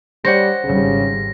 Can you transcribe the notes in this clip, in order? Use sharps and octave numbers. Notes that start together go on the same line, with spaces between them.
G3 C5 C#5 F#5 A#6
G#1 C#3 G3